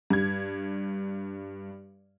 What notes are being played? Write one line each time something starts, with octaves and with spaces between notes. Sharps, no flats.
G2 G#6